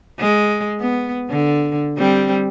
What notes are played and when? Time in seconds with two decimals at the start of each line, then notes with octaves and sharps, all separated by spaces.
0.20 G#3
0.80 B3
1.29 D3
1.98 G3 C4